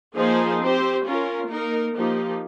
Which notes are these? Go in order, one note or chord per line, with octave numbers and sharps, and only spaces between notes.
F3 A#3 D#4 G#4 C5
C4 G4 C5
C#4 F4 A#4
A#3 D#4 A#4
F3 A#3 D#4 G4